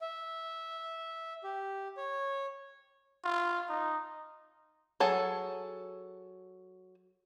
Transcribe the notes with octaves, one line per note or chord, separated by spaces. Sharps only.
E5
G4
C#5
F4
D#4
F#3 G#4 A4